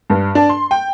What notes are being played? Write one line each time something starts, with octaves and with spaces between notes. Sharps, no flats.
G2
D4
C6
G5